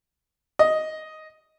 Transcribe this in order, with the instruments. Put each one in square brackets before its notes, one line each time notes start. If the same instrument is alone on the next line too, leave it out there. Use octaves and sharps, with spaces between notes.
[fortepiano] D#5